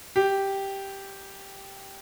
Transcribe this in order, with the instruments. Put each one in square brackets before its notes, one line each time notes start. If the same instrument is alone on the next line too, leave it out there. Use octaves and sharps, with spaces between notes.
[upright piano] G4